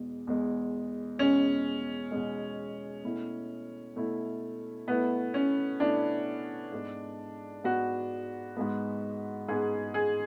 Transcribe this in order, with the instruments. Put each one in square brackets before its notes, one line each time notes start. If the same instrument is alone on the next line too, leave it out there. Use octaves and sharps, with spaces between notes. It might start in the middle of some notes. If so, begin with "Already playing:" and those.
Already playing: [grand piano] E2 B2 G#3
E2 B2 G#3
[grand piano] E2 B2 G#3 [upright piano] C#4
[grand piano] E2 B2 G#3
B2 A3 E4
B2 A3 E4
[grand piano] B2 A3 E4 [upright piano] B3
[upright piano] C#4
[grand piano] B2 A3 E4 [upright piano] D4
[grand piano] G#2 G#3 B3
[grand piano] G#2 G#3 B3 [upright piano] F#4
[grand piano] G#2 G#3 B3
[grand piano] G#2 G#3 B3 [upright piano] G#4
[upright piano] G#4